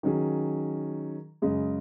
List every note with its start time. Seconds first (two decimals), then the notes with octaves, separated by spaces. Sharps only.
0.03 D#3 F#3 C#4 G#4
1.42 F#2 C#3 G#3